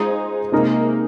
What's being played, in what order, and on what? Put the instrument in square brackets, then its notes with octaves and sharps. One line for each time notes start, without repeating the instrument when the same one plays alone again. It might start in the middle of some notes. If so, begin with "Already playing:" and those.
Already playing: [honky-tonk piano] G#3 F4 C5 [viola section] D#4 G#4
[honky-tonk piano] C3 G#3 D#4 A#4 D#5 [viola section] A#3